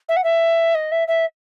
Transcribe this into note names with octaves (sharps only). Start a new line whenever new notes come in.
E5
F#5
E5
D#5
E5
E5